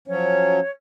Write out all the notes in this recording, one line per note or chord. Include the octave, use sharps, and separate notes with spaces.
F3 F#3 C#4 C#5